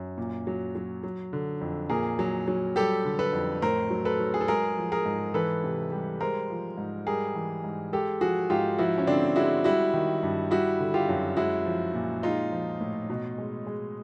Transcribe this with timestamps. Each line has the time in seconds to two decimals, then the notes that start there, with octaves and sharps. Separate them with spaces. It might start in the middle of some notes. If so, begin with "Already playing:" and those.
Already playing: F#2
0.18 A#2
0.47 F#3
0.75 F#3
1.04 F#3
1.33 D3
1.61 F2
1.90 A#2 G#4 A#4
2.19 F#3
2.48 F#3
2.76 G3 G4 A4
3.05 D3
3.19 A4 B4
3.33 F2
3.62 A2 A#4 C5
3.90 F#3
4.05 A4 B4
4.19 F#3
4.34 G#4
4.41 A4
4.48 G#3 G#4 A#4
4.77 F3
4.92 G#4 A#4
5.06 G#2
5.34 E3 A4 B4
5.64 C3
5.91 G3
6.20 G#3 A#4 C5
6.50 F3
6.77 G#2
7.06 G3 G#4 A#4
7.35 E3
7.64 G#2
7.92 G#3 G4 A4
8.21 F3 F#4 G#4
8.50 G#2 F4 G4
8.79 F3 E4 F#4
8.98 C#4
9.07 D3 C4 D4
9.36 G#3 E4 F#4
9.64 G3 E4 F#4
9.94 D#3
10.23 G2
10.51 G3 E4 F#4
10.80 D3
10.94 F4 G4
11.09 F#2
11.37 G#3 E4 F#4
11.66 F3
11.94 A#2
12.23 G#3 D#4 F4
12.52 F3
12.81 A2
13.10 B2
13.38 G#3
13.66 G#3